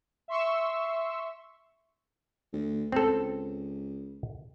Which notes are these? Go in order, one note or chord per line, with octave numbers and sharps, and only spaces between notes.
E5 C6 C#6 E6
D2
C#2 C4 A4